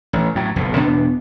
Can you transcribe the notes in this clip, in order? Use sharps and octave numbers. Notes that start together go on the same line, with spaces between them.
A1
A2 F#3
F#1 B1 A2
E2 B2 B3 D4